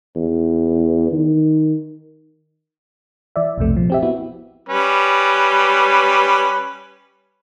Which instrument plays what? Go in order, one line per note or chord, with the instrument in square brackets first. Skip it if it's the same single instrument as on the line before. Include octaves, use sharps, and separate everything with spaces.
[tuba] E2
D#3
[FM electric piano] E3 D5 E5
B1 F2 C3 A3
A#2 F3
C4 G4 E5
B3 E4 F#4
[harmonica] G3 C#4 B4